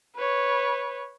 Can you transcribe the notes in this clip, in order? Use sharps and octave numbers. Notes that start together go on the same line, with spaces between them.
B4 C#5